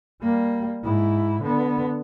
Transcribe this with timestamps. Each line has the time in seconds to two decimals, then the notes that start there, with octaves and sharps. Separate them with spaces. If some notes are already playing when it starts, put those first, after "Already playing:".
0.22 G3 A#3
0.84 G#2 E4
1.43 D3 B3